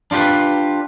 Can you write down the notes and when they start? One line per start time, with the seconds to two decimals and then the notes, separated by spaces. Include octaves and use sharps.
0.11 D4 F4 G4 B4